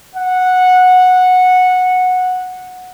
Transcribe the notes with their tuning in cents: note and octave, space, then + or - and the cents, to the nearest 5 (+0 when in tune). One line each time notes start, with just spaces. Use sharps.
F#5 -10